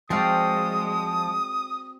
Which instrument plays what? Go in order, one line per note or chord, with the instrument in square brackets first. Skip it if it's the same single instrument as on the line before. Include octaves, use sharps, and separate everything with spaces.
[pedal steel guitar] F3 F5 [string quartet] G#3 [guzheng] C4 F#4 D5 [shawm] D#6